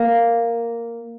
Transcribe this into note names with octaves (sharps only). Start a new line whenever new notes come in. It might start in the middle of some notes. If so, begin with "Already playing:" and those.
Already playing: A#3